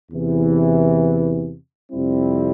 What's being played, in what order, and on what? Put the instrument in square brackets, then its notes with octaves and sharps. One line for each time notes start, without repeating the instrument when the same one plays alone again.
[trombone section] E2 C3 E3
F2 C3 G3 C4 E4